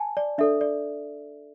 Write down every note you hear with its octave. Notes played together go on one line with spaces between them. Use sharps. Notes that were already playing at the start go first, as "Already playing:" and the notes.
Already playing: G#5 A5
D5
D4 A4 D5 E5
D5